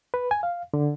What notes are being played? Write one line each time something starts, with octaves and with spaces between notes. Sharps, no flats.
B4
G#5
F5
D3